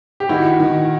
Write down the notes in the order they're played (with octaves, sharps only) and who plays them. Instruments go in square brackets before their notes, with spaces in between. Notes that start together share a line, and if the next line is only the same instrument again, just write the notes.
[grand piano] G4
[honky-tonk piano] D#3 [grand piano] E4 F#4
[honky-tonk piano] D#3